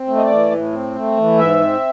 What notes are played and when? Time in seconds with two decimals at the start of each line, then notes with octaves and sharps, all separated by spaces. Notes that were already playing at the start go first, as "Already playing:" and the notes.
Already playing: C4
0.08 A3
0.17 D#5
0.23 D5
0.30 E3
0.51 A2
0.73 C4
0.95 A3
1.17 E3
1.39 G#2 E5
1.60 C4